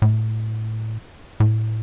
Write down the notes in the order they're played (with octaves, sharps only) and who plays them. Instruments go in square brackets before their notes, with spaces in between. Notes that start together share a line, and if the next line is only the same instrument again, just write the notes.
[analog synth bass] A2
A2